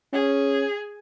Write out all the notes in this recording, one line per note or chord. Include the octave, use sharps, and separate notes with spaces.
C#4 G#4